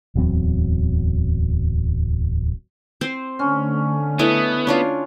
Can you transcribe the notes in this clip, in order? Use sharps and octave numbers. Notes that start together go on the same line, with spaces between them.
D1 E2 F#3 C4
C4 C5
D3 A3 C#4
B3 E4 A4 D#5
C#4 D4 F4 C#5